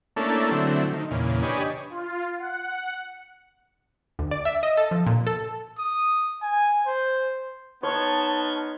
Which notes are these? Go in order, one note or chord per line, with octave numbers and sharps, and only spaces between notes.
A3 A#3 C#4 D4 E4 A4
D3 F#3 A3 C4 E4
D#3
E2 A#2 C#3
D4 G4 B4 C#5 D#5 G#5
F4
F#5
D2
D5
E5
D#5
A4
F3
A#2
A4
D#6
G#5
C5
B3 D#4 C#5 A5 C6 C#6 F6